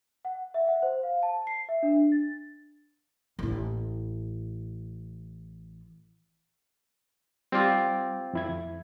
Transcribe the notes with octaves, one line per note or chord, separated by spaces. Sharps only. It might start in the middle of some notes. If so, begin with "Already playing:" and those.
F#5
E5
F#5
C5
F5
A5
C7
E5
D4
A6
A1 E4
G3 C4 F4 D6
F2 E4 G#6